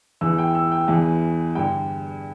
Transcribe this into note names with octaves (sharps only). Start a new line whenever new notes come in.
E2 E3 E6
G5
E6
G5
E2 E3
G2 D3 G5